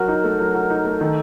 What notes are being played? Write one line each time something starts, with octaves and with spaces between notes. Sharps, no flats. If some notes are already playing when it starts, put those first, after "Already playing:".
Already playing: F#3 F#4 A#4
D#4
A3
F#3
F#4
D#4
A3
D#3 A4